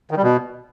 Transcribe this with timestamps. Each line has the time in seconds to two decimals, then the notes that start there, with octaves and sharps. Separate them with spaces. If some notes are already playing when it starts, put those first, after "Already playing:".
0.11 D#3
0.17 G3
0.23 B2